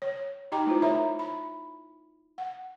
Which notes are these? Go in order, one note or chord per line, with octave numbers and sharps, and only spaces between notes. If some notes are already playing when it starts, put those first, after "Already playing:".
C#5
D#4 G4 D#5 G5 A#5 D6
A3 E4 F4 C5
A#4 C#5 E5 A#5 B5
B5
F#5